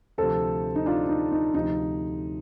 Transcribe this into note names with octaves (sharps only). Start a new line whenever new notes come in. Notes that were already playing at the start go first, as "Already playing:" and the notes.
D2 C3 F3 A4 C5
D#4
D4 F4
D#4
D#4
D2 C3 F3 D#4